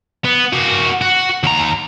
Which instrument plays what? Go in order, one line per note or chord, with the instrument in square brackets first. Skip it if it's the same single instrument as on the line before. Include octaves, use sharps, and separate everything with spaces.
[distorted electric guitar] B3
A#3 F#4
F#4
D#2 A#5